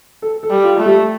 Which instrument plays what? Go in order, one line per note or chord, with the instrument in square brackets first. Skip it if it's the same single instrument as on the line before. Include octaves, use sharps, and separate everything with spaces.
[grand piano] A4
A4
[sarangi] G3
[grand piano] F4
[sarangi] A3
[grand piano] G3